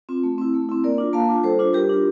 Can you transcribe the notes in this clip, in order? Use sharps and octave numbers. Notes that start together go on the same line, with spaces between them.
C4 F4
A3
C4 E4
A3
C4 E4
A#3 A#4 D5
D4 F4
A#3 F5 A5
D4 F4
G3 A4 C5
D4 F4
G3 G4 A#4
D4 F4